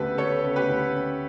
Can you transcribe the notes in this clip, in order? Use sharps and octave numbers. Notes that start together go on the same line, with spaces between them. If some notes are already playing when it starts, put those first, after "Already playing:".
Already playing: D2 C#3 B3 G4 A4 B4
B3 A4 C#5
C#3
G4 B4
D2
C#4